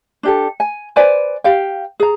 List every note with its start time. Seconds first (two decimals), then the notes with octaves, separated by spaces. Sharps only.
0.23 D4 G4 A4
0.60 G#5
0.96 B4 C5 D5 G#5
1.44 G4 F5 G5
2.00 G#4 A#5